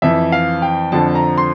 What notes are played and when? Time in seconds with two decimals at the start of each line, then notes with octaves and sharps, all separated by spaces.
0.02 F2 E3 E5
0.32 F5
0.62 G5
0.92 F2 D3 F3 A5
1.15 A#5
1.37 C6